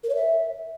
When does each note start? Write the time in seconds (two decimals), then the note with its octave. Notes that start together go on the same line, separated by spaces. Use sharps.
0.03 A#4
0.09 C#5
0.15 E5